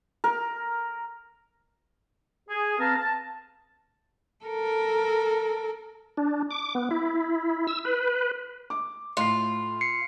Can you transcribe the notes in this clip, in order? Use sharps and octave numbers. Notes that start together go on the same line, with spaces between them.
A#4
G#4
C4 B4 F5 A5 A#5 F6
A5
A4 A#4
D4
D6
B3
E4
E6
B4
D6
A2 F4 C7
C7 C#7